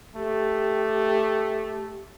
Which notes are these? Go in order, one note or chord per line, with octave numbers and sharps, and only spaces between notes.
A3 G4